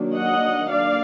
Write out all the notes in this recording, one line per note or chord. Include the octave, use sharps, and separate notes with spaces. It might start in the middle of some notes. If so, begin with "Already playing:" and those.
Already playing: D#3 F#3 A#3 D4
D#5 F#5
A#3 D4 D5 F5